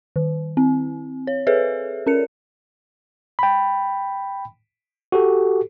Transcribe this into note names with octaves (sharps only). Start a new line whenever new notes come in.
D#3
C4
C#5
G#4 A4 B4 C#5 E5
C#4 A#4 C#7
G5 B5
F#4 G4 A4